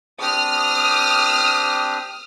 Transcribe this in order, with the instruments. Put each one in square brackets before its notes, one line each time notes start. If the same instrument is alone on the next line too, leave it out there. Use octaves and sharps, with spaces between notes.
[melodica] C4 D4 G4 [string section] D#6 F6